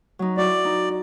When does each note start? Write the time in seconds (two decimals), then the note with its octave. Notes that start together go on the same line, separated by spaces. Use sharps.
0.19 F#3 D#4
0.38 E4 F#4 D5
0.64 D#4